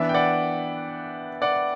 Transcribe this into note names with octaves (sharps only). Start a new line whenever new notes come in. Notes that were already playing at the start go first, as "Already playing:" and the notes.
Already playing: E3 B3 D4 E5
G5
D5 F#5
D5 F#5